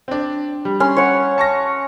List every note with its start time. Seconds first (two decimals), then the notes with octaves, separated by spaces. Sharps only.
0.08 C4 D4
0.65 G3
0.80 C#4 C6
0.96 C#5 F#5
1.38 A5 C#6 A#6